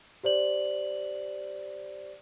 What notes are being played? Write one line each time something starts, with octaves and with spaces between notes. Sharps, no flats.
G4 C5 D5 F#7